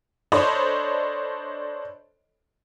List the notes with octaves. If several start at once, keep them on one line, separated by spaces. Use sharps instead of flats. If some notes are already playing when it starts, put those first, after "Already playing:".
D4 A4 C5 C#5 D#5 B5